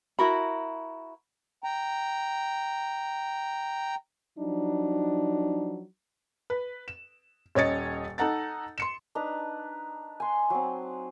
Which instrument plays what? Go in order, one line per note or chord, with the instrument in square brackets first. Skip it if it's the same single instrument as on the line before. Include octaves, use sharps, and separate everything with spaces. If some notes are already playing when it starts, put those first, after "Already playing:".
[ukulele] E4 F#4 A#4 B5
[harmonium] G5 A#5
[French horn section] F3 F#3 D4 D#4
[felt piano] B4
E7
D#1 C#4 C#5 D#5 A6 C#7
D#4 A4 F#5 A#5 A6
C6 C#7 E7
[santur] D4 D#4 B4 A#5
G#5 C6
F#3 C4